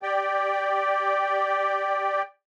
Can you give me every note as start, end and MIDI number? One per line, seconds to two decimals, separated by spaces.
0.03 2.22 67
0.03 2.22 74
0.03 2.22 79